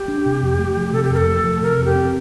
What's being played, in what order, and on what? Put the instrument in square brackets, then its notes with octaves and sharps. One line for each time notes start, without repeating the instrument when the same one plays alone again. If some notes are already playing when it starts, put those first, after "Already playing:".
Already playing: [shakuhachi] G4
[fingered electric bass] D4
C3
F2
A3
F3
[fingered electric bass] C3 [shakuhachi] A4
[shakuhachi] G4
[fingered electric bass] F2 [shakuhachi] A#4
[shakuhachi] A4
[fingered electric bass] A3
F3
[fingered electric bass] C3 [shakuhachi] A#4
[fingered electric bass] F2
[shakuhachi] G4
[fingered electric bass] C4